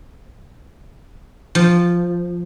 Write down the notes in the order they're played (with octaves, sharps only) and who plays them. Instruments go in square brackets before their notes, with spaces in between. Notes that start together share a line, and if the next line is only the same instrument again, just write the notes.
[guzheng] F3